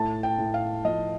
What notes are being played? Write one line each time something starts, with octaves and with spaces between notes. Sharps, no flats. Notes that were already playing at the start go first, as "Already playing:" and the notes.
Already playing: A2 A5
G5
A2
F5
F3 D#5